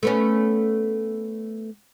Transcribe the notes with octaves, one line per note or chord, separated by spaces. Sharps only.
A3 B3 C#4